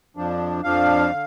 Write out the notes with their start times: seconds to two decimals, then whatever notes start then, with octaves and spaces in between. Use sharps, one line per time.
0.17 F2 F3 D4
0.64 F2 F3 D4 F5
1.12 D3